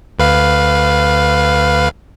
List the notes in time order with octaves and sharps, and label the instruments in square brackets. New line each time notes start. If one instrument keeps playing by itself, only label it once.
[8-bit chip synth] D2 B4 F5